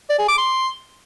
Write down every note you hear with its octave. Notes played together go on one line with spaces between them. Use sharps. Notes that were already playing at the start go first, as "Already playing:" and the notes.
D5
G#4
D6
C6